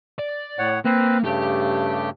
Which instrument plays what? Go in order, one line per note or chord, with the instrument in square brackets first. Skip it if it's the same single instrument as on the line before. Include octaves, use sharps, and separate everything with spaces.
[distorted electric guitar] D5
[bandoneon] A2 C#5 F#5
[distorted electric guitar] A#3 [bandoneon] C4 B4
[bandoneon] G2 C#3 A3 [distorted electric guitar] G4